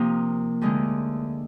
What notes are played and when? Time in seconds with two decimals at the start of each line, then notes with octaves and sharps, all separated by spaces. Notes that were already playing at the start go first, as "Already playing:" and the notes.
Already playing: C3 F3 A#3 D#4 A#4
0.61 D2 D3 G#3 C4 D#4